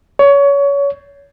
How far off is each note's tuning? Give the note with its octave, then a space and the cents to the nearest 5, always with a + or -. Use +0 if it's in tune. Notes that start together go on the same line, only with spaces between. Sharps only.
C#5 +25